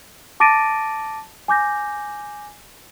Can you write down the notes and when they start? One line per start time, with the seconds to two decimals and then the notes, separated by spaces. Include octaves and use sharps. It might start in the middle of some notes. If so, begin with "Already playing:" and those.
0.40 A5 D6 A6 A#6 D7 D#7
1.48 G#5 D6 G6 A#6